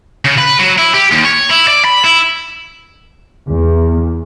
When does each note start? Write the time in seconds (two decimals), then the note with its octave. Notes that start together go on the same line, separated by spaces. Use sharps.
0.25 C#3
0.38 B4
0.59 F#3
0.78 E4
0.94 G4
1.11 D#2
1.25 C#5
1.50 E4
1.67 D5
1.85 B5
2.05 E4
3.47 E2